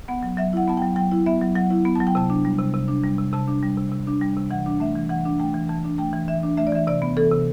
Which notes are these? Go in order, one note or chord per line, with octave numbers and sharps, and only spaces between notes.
B3 F#5
F#3
F#3 E5
E4 F#5
B3 A5
F#3 G5
F#3 G5
E4
B3 E5
F#3
F#3 F#5
E4
B3
F#3 A5
G5
C3 A5
D4
G3
C3
C3
D4
G3
C3
C3 A5
D4
G3
C3
C3
D4
G3
C3
E3 F#5
D4
A3 E5
E3
E3 F#5
D4
A3 G5
E3
E3 A5
D4
A3 G5
E3
E3 E5
D4
A3 E5
D5
E3 E5
C3 D5
B3
E3 A4
C3